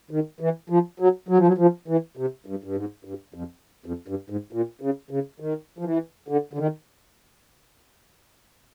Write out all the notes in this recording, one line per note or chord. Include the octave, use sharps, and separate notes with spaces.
D#3
E3
F3
F#3
F#3
F3
F#3
F3
E3
C3
G2
G2
G#2
G2
F2
F2
G2
G#2
A#2
C#3
C#3
D#3
F3
E3
D3
D3
D#3